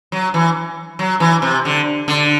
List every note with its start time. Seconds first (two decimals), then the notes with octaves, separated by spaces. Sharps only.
0.12 F#3
0.34 E3
0.99 F#3
1.20 E3
1.42 C3
1.65 D3
2.08 D3